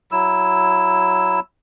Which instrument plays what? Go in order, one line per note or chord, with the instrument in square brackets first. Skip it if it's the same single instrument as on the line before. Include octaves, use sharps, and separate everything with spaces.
[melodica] F#3 E4 E6